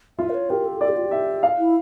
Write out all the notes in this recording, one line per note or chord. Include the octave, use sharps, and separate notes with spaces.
F4 E5
A#4
C#5
G4 A#4
A4
A4 D5
G4
F4
G4
E5
F5
E4